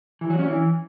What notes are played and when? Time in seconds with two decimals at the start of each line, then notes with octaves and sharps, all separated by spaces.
0.21 E3
0.30 F#3
0.39 C#4
0.48 E3